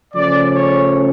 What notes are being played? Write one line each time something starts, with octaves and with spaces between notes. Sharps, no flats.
C#3 F3 A3 C#4 D5
C#5